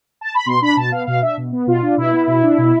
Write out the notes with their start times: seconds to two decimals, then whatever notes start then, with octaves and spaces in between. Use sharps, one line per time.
0.21 A5
0.35 B5
0.46 B2 C6
0.62 D4 B5
0.77 B2 A5
0.92 B3 F5
1.07 B2 F5
1.22 D4 E5
1.38 B2
1.52 B3
1.67 B2 F4
1.82 D4
1.98 B2 E4
2.13 B3
2.27 B2
2.43 D4
2.58 B2